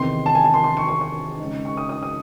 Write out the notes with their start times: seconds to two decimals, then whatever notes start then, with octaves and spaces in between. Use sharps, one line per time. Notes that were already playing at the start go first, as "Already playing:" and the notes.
Already playing: E2 C3 D#3 C6
0.26 A5
0.35 G#5
0.45 A5
0.54 C6
0.64 C6
0.77 C#6
0.89 C#6
1.01 C#6
1.39 C#3 G#3 D#4
1.65 C#6
1.77 D#6
1.89 D#6
2.03 D#6